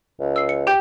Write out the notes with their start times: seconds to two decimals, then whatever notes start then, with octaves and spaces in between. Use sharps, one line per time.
0.20 C#2
0.36 E6 C7
0.49 C#7
0.67 G4 G5 G6